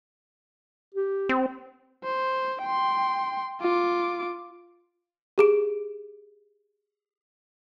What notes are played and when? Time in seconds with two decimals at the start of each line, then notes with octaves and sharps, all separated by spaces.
0.95 G4
1.29 C4
2.04 C5
2.62 G5 C6
3.60 F4 D6
5.38 G4 G#4 D7